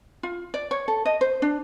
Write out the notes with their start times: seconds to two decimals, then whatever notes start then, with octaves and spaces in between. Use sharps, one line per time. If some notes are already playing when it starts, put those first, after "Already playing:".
0.23 F4
0.54 D5
0.71 C#5
0.88 A4
1.05 D#5
1.21 C5
1.42 D4